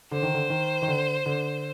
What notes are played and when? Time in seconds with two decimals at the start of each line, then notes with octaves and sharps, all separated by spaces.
0.11 D3 C5
0.22 D#3
0.34 D3
0.50 D#3
0.82 D#3
0.88 D3
1.26 D3